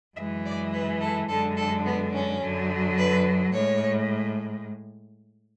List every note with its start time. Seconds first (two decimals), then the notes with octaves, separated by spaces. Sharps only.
0.16 F#2 E3 G#3 E5
0.46 D5
0.74 B4
1.01 A4
1.29 F#2 D3 G#3 A4
1.57 A4
1.86 B3
2.14 C#4
2.41 F#2 D3 F#3
2.98 B4
3.54 A2 G#3 C#5